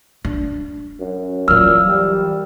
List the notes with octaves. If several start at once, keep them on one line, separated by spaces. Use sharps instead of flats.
D4
F#2
A#2 E3 F#3 E6 F6
G3